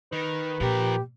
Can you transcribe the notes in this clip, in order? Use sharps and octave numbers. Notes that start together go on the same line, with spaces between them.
D#3 B4
A#2 F3 G4 A#4